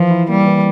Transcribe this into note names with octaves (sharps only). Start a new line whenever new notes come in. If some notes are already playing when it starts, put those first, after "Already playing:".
Already playing: E3 F3
E4
G3 A#3
E3